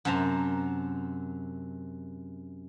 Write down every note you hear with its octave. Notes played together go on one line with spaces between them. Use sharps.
F#2 C3 A5 A#5